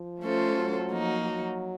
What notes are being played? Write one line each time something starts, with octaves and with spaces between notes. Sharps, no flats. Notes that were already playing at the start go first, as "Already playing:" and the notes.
Already playing: F3
A3 C#4 F4 A4 C5
F#3
F3 A#3 D#4 F#4
F#3